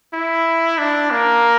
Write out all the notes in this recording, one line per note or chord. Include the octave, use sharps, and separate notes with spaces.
E4
D4
A#3